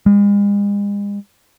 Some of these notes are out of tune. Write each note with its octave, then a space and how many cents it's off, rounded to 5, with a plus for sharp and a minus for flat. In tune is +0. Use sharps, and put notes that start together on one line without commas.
G#3 -40